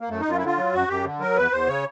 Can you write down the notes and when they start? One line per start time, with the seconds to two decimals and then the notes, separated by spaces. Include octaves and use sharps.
0.01 A#3
0.09 F#2 A3
0.20 D#4
0.25 F#2 F4
0.38 E4
0.41 D3 F4
0.57 F#3
0.73 F#2 F#4
0.88 F#2 G4
1.04 D3
1.20 F#3 A#4
1.36 E2 B4
1.51 E2 C5
1.67 C#3 C#5